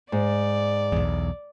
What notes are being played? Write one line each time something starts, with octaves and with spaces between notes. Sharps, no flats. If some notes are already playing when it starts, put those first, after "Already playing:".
G#2 D5
B1 E2